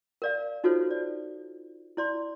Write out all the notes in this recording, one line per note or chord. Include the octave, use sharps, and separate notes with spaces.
A#4 D5 F5
D#4 F4 F#4 A4 C5 C#5
D5
E4 D5 C6